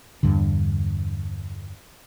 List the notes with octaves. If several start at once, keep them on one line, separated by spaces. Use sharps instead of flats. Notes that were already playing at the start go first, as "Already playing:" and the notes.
E2 G2 D3